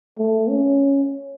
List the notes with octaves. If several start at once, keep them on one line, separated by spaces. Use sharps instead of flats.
A3
C#4